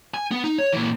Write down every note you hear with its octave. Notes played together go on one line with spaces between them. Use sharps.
G#5
B3
D#4
C#5
A#2 E3